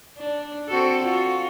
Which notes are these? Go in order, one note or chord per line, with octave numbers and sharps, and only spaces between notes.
D4
C4 F#4 A4
F4 F#4